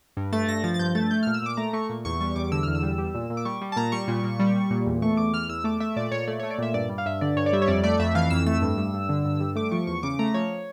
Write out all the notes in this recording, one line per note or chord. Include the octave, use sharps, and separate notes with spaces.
G2
A3 A6
G2 A#6
F3 A6
A6
G2 G6
A3 A6
A3 G6
A#2 F6
E6
A#2 D6
A3 A#5
A3 C#6
A#2
E2 C#6
G3 C#6
E2 D6
D3 E6
E2 F6
E6
G3
G3
A#2
A#2
D6
G3 C#6
G3
A5
A#2 A#5
G3 C#6
A#2
A#2
G3
G3
A#2
E2
A3 C#6
E2 D6
E3 F6
E2 E6
A3 D6
A3 E5
A#2 D5
A#2 C#5
A3 D5
A3 C#5
D5
A#2 E5
G2 D5
G3
F5
G2 E5
D3 D5
G2 C#5
D5
G3 E5
C#5
F2 D5
A3 D5
F2 E5
E3 F5
F2 E6
A3 E6
G2
G3
G2
D3
G2
G3
A3 D6
F3 C#6
E2 C#6
C#3 D6
A3 A#5
F3 C#5